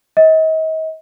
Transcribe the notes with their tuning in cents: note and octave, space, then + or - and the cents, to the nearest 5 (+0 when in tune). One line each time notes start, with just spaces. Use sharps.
D#5 +40